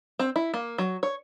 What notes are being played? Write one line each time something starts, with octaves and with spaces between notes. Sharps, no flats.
C4
E4
A#3
F#3
C#5